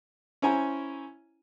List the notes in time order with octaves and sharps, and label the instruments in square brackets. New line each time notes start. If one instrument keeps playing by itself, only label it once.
[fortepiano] C#4 E4 C5 G#5 A#5